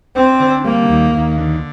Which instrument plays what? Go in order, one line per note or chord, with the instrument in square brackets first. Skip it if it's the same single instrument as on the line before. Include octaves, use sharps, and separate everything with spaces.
[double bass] C4 [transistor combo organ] D4
[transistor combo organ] D3
[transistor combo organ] G3 [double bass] A#3
[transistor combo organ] D#2
D#2
D3